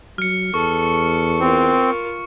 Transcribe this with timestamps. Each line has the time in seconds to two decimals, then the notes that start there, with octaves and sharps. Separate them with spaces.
0.18 F#3 F6 C#7
0.54 E2 A4 C#6
1.40 C4 F4 A#4